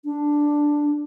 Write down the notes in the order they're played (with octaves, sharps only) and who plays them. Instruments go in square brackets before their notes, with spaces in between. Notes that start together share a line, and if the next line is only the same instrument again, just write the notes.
[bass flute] D4